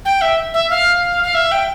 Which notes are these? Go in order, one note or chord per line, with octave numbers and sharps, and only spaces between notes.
G5
E5
E5
F5
F5
E5
G5